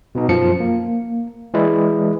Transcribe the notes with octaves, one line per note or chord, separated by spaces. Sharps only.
B2 B3 D#4
F#2 F3 C#7
A#3
E3 G#3 E4 D5